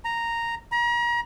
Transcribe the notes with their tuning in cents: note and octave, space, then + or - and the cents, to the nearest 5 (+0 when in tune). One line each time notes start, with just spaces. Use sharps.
A#5 -5
A#5 +35